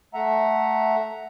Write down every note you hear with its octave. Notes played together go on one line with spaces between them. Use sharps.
A3 E5 F#5 A#5